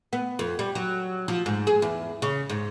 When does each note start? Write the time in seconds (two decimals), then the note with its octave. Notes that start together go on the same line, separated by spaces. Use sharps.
0.13 B3
0.39 F2
0.59 G3
0.75 F#3
1.28 F3
1.46 G#2
1.67 G#4
1.82 E2
2.22 C#3
2.50 G#2